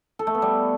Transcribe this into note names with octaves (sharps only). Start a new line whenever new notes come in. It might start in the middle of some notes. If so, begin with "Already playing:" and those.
A4
A3
B3
G3